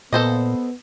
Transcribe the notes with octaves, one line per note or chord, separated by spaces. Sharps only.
A#2 B3 A4 C5 D#5